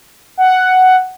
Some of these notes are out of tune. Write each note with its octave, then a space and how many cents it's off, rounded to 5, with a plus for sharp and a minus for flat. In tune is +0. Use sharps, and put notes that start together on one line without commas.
F#5 +5